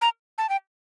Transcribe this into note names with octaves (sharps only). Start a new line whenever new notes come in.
A#5
A5
G5